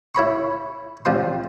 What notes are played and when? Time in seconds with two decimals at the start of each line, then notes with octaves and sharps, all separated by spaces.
0.15 E4 C#5 B5 C#6
1.05 C2 F3 D4 C6